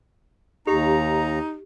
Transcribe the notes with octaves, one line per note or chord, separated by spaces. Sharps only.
D#2 D#4 G4 A#5